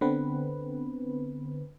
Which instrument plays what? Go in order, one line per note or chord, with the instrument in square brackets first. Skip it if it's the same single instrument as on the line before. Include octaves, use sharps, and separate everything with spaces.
[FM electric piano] D3 B3 C4 B4